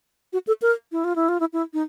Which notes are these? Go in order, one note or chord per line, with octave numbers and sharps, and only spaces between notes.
F#4
A4
A#4
E4
F4
E4
F4
E4
E4
D#4